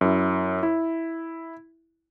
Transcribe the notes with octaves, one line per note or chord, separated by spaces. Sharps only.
F#2 E4
E4